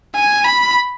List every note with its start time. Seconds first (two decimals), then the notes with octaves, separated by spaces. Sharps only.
0.15 G#5
0.44 B5